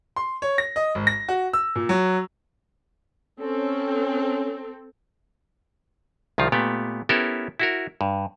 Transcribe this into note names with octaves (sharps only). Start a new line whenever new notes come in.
C6
C#5
A#6
D#5
G#1
A#6
F#4
E6
A#2
F#3
C4 C#4 A4
C2 D#3 F3 F4
A#2 A3 B3 G4
B3 C#4 E4 G4 A4 A#4
E4 F#4 A#4
G2